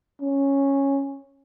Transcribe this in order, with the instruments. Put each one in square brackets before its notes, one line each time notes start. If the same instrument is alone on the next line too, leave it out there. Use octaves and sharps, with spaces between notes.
[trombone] C#4